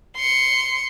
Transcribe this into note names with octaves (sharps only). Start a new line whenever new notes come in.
C6 C#7